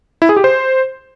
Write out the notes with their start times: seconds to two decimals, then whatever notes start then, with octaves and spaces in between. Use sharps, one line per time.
0.22 E4
0.29 G#4
0.37 G4
0.44 C5